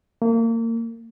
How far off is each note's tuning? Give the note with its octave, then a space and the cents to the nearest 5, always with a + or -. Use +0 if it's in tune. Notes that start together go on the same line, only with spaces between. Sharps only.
A#3 -30